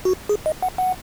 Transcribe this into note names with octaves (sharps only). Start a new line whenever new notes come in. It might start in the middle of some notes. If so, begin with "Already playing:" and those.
F#4
G#4
D#5
F#5
F#5